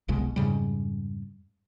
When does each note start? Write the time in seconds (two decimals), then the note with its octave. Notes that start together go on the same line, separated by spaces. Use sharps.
0.08 F#1 C2 B2 G#3
0.36 F2 G#2 C#3 G3